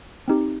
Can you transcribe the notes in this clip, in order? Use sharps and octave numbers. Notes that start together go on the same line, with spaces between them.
C4 D#4 G4